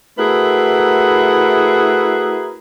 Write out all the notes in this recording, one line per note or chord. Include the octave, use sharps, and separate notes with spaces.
A3 E4 F#4 G#4 A#4 B4